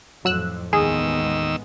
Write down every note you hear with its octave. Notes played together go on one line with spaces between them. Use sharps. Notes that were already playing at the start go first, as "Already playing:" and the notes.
F2 A2 F#3 E6 F#6
A1 D#2 D#3 G#3 B3 G#4 E6